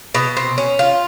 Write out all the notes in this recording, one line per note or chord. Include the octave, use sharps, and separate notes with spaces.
B2
C4
C#4
F4